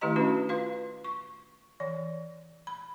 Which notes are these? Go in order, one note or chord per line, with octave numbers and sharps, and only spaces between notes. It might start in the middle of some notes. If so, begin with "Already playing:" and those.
D#3 A3 E4 G4 D#5 A#5
C#4 D4 F#4 B4
F4 B4 F5
C#6
E3 D5
B5